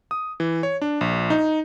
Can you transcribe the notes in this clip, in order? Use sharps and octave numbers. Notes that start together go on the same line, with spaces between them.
D#6
E3
C#5
D4
A#1
D#4